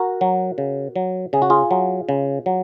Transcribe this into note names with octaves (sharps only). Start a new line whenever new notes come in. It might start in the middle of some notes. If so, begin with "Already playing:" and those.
Already playing: F#4 A#4
F#3
C#3
F#3
C#3 G#4
F#4
F4 G#4
F#3
C#3
F#3